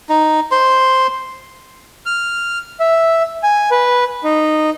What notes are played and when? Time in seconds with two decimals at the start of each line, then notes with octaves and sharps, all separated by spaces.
0.09 D#4
0.51 C5 C6
2.06 F6
2.80 E5
3.43 G#5
3.71 B4
4.24 D#4